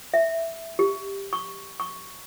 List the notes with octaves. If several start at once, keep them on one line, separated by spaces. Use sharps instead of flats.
E5
G4
C#6
C#6